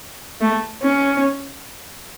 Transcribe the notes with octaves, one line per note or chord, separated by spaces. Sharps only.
A3
C#4